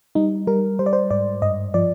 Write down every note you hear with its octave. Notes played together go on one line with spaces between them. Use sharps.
G3 D#4
G3 A#4
G3 C5
D5
C5
G#2 D5
G2 D#5
F3 D5